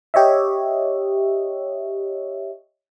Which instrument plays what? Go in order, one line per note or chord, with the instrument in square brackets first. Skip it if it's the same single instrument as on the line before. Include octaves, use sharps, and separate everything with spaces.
[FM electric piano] G4 C#5 D#5 E5